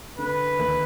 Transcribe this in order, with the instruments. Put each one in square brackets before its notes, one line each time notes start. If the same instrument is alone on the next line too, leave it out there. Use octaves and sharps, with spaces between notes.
[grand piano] D3 [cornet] B4
[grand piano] D#2